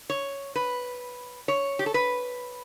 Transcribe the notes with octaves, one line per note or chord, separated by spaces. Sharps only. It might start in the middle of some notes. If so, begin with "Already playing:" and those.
C#5
B4
C#5
G4
A4
B4